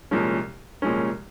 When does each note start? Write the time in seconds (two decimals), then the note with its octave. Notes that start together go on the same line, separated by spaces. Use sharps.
0.11 C2 A#2 F3 G#3 C#4
0.82 C2 A#2 F3 G#3 C#4